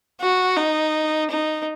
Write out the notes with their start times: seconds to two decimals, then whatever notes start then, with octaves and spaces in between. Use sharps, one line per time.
0.21 F#4
0.57 D#4
1.30 D#4